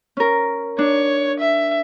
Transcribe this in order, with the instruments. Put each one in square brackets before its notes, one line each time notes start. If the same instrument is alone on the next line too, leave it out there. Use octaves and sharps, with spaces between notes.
[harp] C#4 A#4
[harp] D4 [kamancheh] C#5
[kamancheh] E5